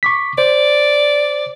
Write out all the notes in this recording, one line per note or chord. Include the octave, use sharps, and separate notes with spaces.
C#6 D6 B6
C5 D5